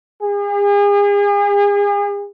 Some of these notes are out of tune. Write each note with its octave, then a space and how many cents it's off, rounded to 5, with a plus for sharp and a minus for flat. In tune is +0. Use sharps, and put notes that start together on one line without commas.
G#4 -40